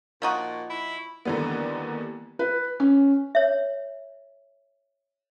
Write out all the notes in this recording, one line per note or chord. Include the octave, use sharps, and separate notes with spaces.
A#2 F3 D#4 F#4
E4
D#2 D3 E3 G3 B3
B4
C#4
C#5 E5